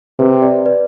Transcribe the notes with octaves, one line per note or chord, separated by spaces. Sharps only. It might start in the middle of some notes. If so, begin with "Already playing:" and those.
C3 B4
B4 D5
B4 D5